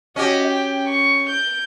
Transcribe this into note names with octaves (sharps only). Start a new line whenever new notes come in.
C#4 F#4 G4 D#5
G5
C#6
G6 D7